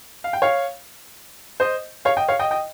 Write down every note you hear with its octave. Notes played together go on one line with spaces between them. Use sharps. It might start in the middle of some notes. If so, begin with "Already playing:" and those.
F5
G5
C#5 F5
C5 D#5
C#5 F5
D#5 G5
C#5 F5
D#5 G5
D#5 G5